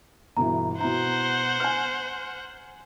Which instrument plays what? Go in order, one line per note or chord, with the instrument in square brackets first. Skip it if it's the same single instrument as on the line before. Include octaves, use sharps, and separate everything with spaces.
[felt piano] G1 B2 E3 [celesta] A#5
[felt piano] B2 E4 [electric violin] C5 F#5 [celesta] A#5
[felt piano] G#5 F6